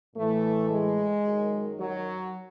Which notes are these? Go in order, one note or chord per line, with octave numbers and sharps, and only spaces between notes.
A2 E3 A3
G#3
F#2 D#3 F#3
F#3